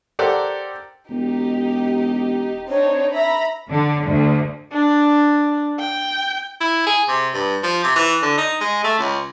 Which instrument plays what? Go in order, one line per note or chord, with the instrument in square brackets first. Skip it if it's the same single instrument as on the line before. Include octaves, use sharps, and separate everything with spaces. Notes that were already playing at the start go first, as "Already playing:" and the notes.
[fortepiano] G4 A4 A#4 C5 D5 F#5
[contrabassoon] E1 [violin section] D#4 G4
[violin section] C4 D4 D#4 [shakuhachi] C#5
[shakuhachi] E5 [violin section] A#5 B5 A#6
[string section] D3
D2
[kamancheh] D4
G5
[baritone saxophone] E4
G#4
C3
G2
F3
C3
E3
D3
D#4
G#3
A3
C#2